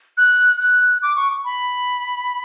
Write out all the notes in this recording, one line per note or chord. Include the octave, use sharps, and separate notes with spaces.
F#6
F#6
D6
C#6
B5